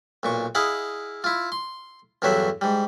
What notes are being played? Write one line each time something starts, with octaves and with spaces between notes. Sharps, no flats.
B1 A#2 C#6
E4 G#4 D#5 F5 F#5
E4 F4
C6
E2 G2 D3 F#3 C#5 E5
G#2 G3